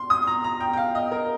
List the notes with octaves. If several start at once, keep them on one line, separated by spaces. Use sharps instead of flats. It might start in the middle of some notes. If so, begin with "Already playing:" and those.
Already playing: C6
D#6
A#5
A#5
G5
G5
F5
D#5
A#4